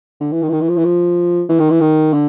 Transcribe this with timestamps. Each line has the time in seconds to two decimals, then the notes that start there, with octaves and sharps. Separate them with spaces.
0.21 D3
0.32 E3
0.42 D#3
0.49 E3
0.53 D#3
0.61 E3
0.69 F3
0.77 E3
0.85 F3
1.49 E3
1.60 D#3
1.70 E3
1.81 D#3
2.13 D3